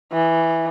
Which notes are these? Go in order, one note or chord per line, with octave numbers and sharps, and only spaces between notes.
E3